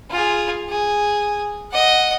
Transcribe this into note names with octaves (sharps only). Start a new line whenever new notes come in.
F4 G#4
G#4
D#5 F#5